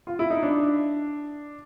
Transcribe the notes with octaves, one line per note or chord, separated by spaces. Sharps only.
F4
E4
D#4
D4